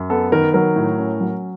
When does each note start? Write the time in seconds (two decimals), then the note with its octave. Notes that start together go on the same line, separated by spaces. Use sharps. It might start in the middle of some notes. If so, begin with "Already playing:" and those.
Already playing: F#2
0.10 B3 A4
0.32 D#3 A#4
0.54 F#3 A#4
0.76 A2
0.98 C#4
1.21 F#3